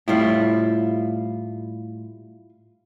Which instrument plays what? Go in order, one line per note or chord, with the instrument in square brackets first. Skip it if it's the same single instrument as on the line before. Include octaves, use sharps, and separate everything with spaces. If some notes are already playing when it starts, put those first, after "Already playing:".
[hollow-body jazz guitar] A2 G3 [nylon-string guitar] E4 F4